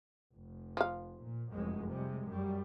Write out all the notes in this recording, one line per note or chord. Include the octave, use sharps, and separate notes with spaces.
F1
F3 F5
A#2
F1 F#2 G#3
C3 G3 G#3
F#2 G3